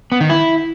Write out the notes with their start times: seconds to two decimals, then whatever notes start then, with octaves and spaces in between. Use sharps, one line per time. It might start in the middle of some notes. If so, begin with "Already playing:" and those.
0.12 B3
0.21 D#3
0.30 E4